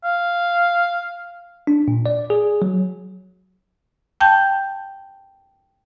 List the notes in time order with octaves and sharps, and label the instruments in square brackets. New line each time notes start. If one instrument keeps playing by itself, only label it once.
[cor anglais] F5
[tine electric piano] D4
A#2
D5
G#4
F#3
[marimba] G5 A5 G6